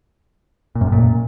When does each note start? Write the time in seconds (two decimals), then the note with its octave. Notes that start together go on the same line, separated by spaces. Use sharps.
0.75 A#2
0.81 F#2
0.87 A2
0.92 A#2